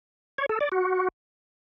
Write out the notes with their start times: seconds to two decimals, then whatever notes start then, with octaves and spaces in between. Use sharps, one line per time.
0.38 C#5
0.49 A4
0.61 D5
0.72 F#4